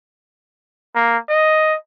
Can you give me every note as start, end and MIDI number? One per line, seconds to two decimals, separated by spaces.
0.95 1.18 58
1.29 1.76 75